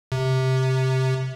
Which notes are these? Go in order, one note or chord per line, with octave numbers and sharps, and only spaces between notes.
C3